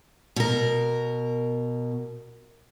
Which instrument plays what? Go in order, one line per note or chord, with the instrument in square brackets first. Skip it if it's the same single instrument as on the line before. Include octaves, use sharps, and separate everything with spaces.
[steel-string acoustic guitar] B2 A#4